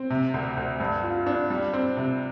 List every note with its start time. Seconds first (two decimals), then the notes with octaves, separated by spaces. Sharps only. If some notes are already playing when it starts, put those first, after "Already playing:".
Already playing: C4
0.10 C3
0.34 D2
0.57 D2
0.80 G2
1.03 F4
1.27 D4
1.50 G3
1.73 C4
1.97 C3